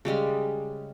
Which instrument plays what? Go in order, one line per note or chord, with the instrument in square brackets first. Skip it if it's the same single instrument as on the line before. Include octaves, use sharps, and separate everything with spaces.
[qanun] C#3 G3 G#3 C#4